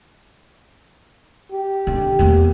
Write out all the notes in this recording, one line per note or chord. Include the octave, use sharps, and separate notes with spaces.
G4
D3
E2 A#3